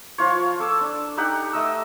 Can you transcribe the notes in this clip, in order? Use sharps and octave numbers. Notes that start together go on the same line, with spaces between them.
F3 F4 C#5
A4 D6 E6
D4
D#4 G4 F#5
A3 D#5 E6